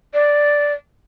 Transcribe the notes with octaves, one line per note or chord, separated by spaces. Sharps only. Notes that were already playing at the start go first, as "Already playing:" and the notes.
D5